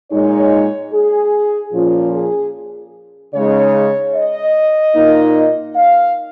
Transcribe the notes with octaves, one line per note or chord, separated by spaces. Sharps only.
A#2 G#3 D#4 C#5
G#4
A#2 F3 C#4 F4
G#4
C#3 G#3 D#4 C#5
D#5
A#2 A#3 D#4
F5